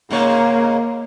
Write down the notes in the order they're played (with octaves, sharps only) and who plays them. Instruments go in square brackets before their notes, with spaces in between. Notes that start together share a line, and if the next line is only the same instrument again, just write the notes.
[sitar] G#2 C#3 C#5 [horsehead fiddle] A#3